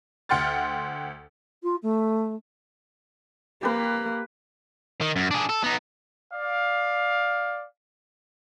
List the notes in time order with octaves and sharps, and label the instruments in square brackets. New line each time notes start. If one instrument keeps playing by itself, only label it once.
[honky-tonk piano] D2 F#5 G5 C6 F6 A6
[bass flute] F4
A3
[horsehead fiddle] A#3 [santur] G4 B4
[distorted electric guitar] D#3
F#2
D4 G#4
A4
B3 D#4
[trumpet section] D5 F5